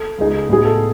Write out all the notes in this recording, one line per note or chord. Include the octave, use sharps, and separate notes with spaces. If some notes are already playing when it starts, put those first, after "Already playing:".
Already playing: A4
C#2 C#3 G#3 D#4 G#4
A2 G#3 B3 D#4 G#4
A4